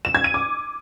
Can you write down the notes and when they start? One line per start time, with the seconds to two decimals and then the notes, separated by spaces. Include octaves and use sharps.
0.05 E7
0.15 G#6
0.24 D#7
0.34 D6